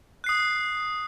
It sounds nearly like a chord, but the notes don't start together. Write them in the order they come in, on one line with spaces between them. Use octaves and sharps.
F#6 C7 D#6